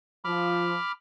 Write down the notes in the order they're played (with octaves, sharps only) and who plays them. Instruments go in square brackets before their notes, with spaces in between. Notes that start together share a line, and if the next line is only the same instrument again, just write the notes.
[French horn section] F3 [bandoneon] B5 D6 F6